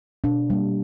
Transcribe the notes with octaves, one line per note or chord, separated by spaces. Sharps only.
B2 D4
G3 A#3